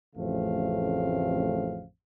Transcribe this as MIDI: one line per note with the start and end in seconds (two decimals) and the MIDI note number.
0.16 1.85 33
0.16 1.85 41
0.16 1.85 49
0.16 1.85 57
0.16 1.85 60
0.16 1.85 77